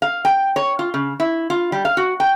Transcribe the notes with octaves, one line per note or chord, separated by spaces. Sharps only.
F5
G5
C#5
F4
C#3
E4
F4
G3
F5
F#4
G5